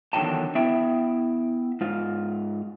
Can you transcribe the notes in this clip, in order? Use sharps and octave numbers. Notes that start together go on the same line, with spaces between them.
E2 D3 D#3 F#3 G5 A5
B3 E4 E5 G5
G#2 F4